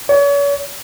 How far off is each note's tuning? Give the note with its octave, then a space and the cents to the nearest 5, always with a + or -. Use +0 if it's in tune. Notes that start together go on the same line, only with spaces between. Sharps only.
C#5 +40